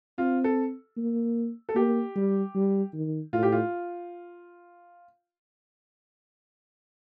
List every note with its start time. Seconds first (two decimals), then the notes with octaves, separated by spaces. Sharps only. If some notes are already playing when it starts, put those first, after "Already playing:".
0.18 C4 F4
0.44 A4
0.97 A#3
1.69 A4
1.75 A#3 G4
2.16 G3
2.55 G3
2.93 D#3
3.33 A2 F4
3.43 G4
3.52 F4